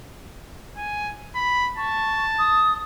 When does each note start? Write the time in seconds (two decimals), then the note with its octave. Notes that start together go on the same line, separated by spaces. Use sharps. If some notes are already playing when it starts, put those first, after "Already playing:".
0.77 G#5
1.35 B5
1.78 A5 C#6
2.39 D#6